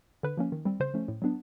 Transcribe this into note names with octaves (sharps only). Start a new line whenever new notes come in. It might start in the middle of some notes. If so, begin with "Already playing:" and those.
D3 B4
F3 A#3 C#4
D#3
G3 C4
C#3 C5
F3 A3 C#4
A2
F#3 B3 D4